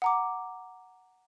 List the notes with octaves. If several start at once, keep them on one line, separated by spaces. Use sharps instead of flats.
F#5 A#5 D6